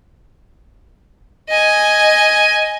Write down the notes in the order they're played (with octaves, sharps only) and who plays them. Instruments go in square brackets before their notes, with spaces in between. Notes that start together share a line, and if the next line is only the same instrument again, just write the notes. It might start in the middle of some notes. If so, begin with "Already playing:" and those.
[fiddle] D#5 G#5